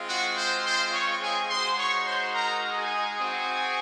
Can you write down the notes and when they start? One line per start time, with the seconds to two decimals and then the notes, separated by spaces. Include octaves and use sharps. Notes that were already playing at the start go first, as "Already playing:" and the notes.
Already playing: G#3 C4 F4
0.09 F#4 F#5
0.37 C5 C6
0.65 C5 C6
0.93 C#5 C#6
1.22 G#4 G#5
1.49 G#3 D#4 F#4 C5 C6
1.78 C#5 C#6
2.06 C5 C6
2.34 A#4 A#5
2.77 G#4 G#5
3.19 C4 F#4